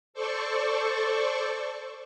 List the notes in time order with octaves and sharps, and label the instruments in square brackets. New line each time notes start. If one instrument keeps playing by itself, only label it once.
[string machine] A4 C5 D5 C#6